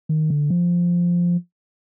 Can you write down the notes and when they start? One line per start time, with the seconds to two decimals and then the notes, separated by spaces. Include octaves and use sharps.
0.09 D#3
0.30 D3
0.50 F3